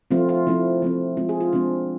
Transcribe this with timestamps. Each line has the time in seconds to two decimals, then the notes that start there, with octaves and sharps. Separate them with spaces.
0.11 F3 A3 C4 F4
0.29 F4
0.47 F3 A3 C4 E4
0.82 F3 A3 C4
1.17 F3 G#3 C4 F4
1.29 G#4
1.40 F4
1.53 F3 G#3 C4 D4